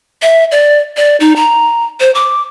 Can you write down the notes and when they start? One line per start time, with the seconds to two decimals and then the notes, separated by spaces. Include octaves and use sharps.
0.22 E5
0.52 D5
0.97 D5
1.20 D#4
1.36 A#5
2.00 C5
2.15 D6